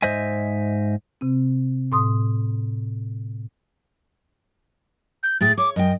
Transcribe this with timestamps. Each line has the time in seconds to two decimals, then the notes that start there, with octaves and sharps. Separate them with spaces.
0.02 G#2 C5 D#5 E5 G#5
1.21 C3 C4
1.92 A2 C6 D#6
5.23 G6
5.41 A2 G#4 G5 A6
5.58 C#5 D6
5.76 F#2 D#5 G5